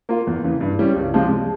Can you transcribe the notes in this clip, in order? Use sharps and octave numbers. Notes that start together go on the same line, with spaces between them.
A#3 F4 A#4
E2
C#3 E3
G2
E3 G3 C#4
C#2
C3 F3 G#3